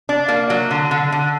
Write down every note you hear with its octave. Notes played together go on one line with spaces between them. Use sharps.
D4
A#3
F#3
D3
D3
D3